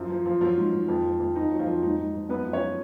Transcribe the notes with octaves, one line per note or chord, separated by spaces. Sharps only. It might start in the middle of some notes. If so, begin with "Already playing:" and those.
Already playing: F#2 F3
F3
F3
F3 F#3 F4
G#2
G#2
F2
F3
F2
F2 D#4
F#3
F3 F4
F2
G#2 D#4
G#2
G#2
F#2 B3 B4
F3
C#4 C#5
F3